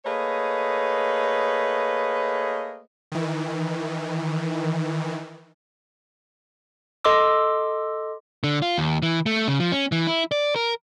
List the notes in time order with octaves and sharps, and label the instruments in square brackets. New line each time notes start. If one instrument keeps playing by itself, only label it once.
[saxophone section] A3 A#3 G#4 B4 C#5 D#5
[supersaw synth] D#3 E3
[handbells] A4 D#5 C6 D6 E6
[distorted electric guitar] D3
F4
D#2
E3
A3
C#3
F3
C#4
E3
E4
D5
A#4